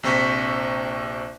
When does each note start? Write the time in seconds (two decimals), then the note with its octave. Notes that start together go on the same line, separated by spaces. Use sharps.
0.03 A#1 C3 C5 C#6 B6